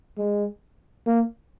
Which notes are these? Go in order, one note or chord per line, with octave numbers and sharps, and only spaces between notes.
G#3
A#3